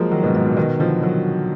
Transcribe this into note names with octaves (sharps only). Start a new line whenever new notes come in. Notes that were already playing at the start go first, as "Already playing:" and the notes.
Already playing: F3 F#3 G#3 A#3
D#3 F#3
G#2 B2
G#2
A#2
B2 D#3
D3 F3
D#3 F#3